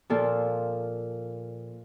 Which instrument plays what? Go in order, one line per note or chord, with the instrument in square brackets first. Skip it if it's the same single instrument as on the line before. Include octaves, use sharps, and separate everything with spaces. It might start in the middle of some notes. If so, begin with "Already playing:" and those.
[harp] A#2 F3 A4